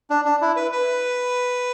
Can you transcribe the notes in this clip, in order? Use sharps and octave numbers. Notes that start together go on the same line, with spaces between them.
D4
D4
E4
B4
B4